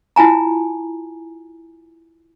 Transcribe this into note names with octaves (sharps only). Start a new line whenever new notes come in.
E4 F4 G#5 A#5